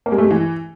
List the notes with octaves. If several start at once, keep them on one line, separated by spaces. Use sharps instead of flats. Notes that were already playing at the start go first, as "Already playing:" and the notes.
A#3
G#3
A3
G#3
E3